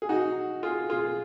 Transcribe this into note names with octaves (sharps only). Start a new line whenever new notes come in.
G#4
D#4 F#4
F4 G#4
F4 G#4